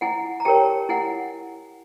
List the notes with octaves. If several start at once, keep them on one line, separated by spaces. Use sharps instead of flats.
E4 F#5 G#5
A#5
G4 A#4 C#5 G5 A5
E4 F#5 G#5